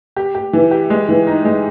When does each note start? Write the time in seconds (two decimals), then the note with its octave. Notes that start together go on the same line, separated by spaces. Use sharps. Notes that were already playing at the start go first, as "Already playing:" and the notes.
0.16 G4
0.35 G4
0.53 E3
0.71 G4
0.90 G#3
1.09 E3
1.27 D#4
1.45 G#3